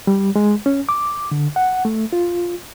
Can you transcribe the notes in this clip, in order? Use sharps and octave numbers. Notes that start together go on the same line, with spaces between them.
G3
G#3
C#4
D6
D3
F#5
A3
F4